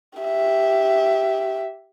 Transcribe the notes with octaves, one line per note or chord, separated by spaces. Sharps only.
G4 E5